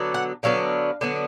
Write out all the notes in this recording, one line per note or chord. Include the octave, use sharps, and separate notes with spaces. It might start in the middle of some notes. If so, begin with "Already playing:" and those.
Already playing: D3 F#3 B3 D4
F#5
D3 F#3 B3 D4 F5
D3 F#3 B3 D4